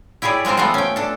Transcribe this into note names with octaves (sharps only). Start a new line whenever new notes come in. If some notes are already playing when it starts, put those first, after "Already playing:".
E4 G4 G#4 C#5 D5
G#3 A#3 C4 F4 C5
A3 B3 C4 F4 F#5
C#4 G5
D4 A4